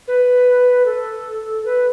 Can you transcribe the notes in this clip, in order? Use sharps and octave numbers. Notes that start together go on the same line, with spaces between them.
B4
A4
B4